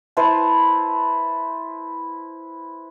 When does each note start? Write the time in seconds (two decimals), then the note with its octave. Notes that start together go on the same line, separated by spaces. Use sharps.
0.17 E4 B4 C5 A5